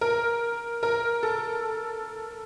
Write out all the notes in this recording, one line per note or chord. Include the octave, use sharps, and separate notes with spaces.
A#4
A#4
A4